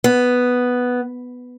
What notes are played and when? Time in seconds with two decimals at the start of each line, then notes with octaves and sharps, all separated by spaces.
0.04 B3